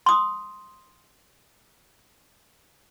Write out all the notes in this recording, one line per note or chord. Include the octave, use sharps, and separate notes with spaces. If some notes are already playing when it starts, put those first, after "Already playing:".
C6 D#6